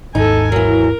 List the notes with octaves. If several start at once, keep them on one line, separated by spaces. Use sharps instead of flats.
G#1 D#2 G#2 D#4 A4 G#5
E3 F#3 A#4